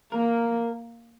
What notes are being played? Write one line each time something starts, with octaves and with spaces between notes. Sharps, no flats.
A#3 A#4